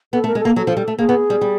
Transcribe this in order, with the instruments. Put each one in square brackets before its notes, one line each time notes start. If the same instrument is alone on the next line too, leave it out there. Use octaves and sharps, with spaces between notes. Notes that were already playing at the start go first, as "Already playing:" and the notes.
[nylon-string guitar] B3 [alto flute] A4
[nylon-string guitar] A3 [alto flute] A#4
[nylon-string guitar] G#3
[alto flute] A4
[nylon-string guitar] A#3
[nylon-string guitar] F#3 [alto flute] A4
[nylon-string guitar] F3
G3
A3
[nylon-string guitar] A#3 [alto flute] G#4
[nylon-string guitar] B3
G3
G3